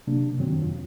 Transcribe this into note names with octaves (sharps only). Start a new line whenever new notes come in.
C3 F#3 A#3 D4
F#2 D#3 F#3 C4
F2 F4